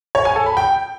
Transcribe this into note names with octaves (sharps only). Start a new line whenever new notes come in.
C#5
G#5
A4
B5
G5